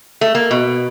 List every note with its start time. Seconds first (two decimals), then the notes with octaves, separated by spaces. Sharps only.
0.21 A3
0.35 A#3
0.51 B2